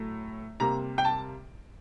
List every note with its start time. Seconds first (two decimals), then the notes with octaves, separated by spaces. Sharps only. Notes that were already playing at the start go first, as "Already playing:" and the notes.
Already playing: A2 F#3 A3
0.60 C3 G3 A#3 A#5
0.98 G5
1.05 A5